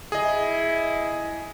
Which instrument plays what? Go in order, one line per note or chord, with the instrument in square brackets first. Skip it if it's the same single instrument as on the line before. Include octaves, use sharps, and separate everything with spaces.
[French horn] E4 [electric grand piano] G#4 D#5